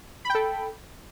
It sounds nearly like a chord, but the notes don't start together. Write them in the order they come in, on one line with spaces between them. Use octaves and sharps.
B5 G5 A4